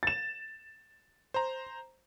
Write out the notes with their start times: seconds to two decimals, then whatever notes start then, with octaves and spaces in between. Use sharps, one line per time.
0.03 A6 E7
1.34 C5 A#5